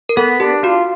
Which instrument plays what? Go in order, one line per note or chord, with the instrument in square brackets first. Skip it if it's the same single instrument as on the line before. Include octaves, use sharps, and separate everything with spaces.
[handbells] A#4
[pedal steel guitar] B3 [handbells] A4
[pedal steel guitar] D4 [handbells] G4
[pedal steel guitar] F4 [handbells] F#4